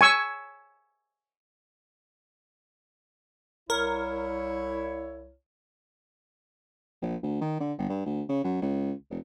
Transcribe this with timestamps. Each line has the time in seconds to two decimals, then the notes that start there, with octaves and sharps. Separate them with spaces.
0.01 G#5 C#6 E6
3.70 C2 E4 A#4 C#5
7.02 A#1
7.23 D2
7.41 D#3
7.60 D3
7.78 G1
7.89 G2
8.06 D2
8.29 C#3
8.44 F#2
8.62 C#2
9.10 F1